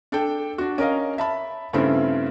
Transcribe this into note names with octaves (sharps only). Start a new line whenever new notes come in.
D4 A4 G5
D4 F#4
C#4 A#4 D#5 F5
E5 A5 B5
G2 C#3 A3 C4 E4